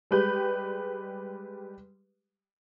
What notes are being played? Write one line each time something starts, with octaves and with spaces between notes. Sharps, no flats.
G3 G#3 G4 B4 G6